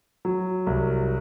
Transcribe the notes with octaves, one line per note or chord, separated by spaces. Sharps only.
F#3
C2